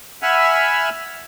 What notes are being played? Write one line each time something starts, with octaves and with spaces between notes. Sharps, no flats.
E5 F#5 G#5 B5 E6 F6